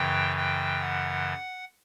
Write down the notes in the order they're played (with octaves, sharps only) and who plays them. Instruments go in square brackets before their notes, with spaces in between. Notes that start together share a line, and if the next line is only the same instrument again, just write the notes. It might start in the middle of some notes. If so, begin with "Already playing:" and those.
Already playing: [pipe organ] F#2 C#3 E3 G5
G5
F#5